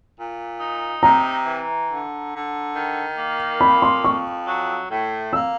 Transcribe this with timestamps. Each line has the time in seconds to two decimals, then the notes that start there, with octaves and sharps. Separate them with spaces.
0.17 A#2
0.60 D#4
1.03 C3 A#5
1.46 E3
1.89 D3
2.32 D3
2.75 D#3
3.18 A#3
3.61 F2 B5
3.82 C6
4.04 F2 C#6
4.47 F#3
4.90 A2
5.33 A#3 E6